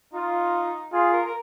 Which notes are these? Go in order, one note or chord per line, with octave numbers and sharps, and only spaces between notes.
D#4 F4
F4 G#4
A#4
A#4